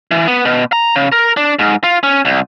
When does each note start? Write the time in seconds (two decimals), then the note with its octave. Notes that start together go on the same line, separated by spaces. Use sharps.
0.11 E3
0.28 B3
0.45 B2
0.73 A#5
0.96 C#3
1.12 A#4
1.37 D4
1.59 G#2
1.84 F4
2.03 C#4
2.25 C2